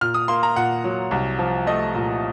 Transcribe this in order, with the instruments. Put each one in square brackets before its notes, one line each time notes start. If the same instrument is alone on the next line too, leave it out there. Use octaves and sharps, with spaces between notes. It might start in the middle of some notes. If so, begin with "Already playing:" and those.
[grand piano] A#2 F6
D#6
A#3 C6
A#5
A#2 F#5
F#3
C2
F3
A3 D#5
A#2